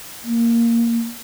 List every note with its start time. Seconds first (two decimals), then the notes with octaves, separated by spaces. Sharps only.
0.24 A#3